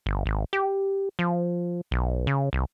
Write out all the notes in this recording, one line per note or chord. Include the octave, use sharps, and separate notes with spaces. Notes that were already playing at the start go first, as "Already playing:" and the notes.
G1
G#1
G4
F3
B1
C#3
C2